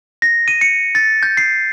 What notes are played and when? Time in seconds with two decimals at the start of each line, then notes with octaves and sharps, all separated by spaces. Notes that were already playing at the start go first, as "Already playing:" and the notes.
0.22 A#6
0.48 D#7
0.61 C#7
0.95 A6
1.23 G6
1.37 C7